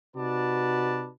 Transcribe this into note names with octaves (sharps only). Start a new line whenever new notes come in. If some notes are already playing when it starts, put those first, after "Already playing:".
C3 D#4 F#4 B4 D5 A5